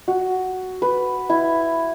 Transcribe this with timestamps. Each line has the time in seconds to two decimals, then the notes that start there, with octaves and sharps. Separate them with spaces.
0.08 F#4
0.82 B4
1.30 E4